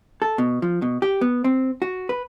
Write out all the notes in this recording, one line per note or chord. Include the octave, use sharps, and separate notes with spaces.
A4
B2
F3
B2
G4
B3
C4
F#4
B4